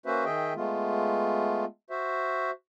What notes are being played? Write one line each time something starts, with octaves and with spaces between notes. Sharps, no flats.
A#3 C#4 F#4 B4 C5 E5
D#3 G#4 D#5 E5 G5
G#3 A3 B3 F4
F#4 C5 E5